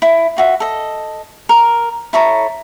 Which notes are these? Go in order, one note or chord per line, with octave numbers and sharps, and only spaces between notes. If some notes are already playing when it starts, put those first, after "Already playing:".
E4
F4 F#4 E5
A4 D#5
A#4
E4 A4 C#5 A#5